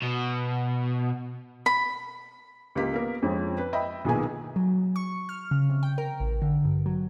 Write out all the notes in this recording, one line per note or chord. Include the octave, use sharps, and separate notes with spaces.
B2
B5
C#2 A#3 G4 B6
A#3 B3 A#4
F2 F3 G#3 C4 C#4
B4
D#5 E5 G5 B5
B1 A#2 D#3 B3 G#4 G#5
F#3
C#6
F6
C#3
C3
G5
A#4
A1
D3
G2
F#3